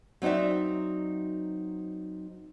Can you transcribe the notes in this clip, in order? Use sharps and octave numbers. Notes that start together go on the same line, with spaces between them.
F#3 C4 D#4 D5 E5